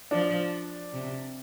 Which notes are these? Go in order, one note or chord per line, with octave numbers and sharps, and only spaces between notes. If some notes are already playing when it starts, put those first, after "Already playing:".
F3 D4
C3